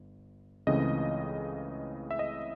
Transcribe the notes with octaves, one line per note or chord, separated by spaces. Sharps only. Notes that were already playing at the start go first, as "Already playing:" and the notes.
Already playing: G1
C#2 C#3 E3 A3 C4 D#5
E5
D#5